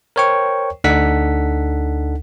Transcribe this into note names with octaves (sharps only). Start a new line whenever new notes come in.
A#4 C5 C#5 G5 C#6
D2 D4 D#4 A4 F#5 B6